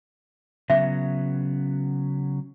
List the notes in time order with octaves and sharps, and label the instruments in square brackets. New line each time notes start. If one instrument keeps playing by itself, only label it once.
[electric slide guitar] C#3 F#3 B3 [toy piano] E5